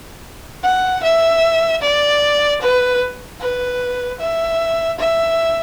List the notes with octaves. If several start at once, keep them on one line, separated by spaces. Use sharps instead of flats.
F#5
E5
D5
B4
B4
E5
E5